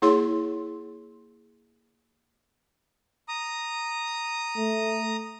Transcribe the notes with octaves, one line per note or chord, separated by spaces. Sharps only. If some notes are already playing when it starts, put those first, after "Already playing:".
A#3 E4 G#4 C#5 C6
A#5 D#6
A3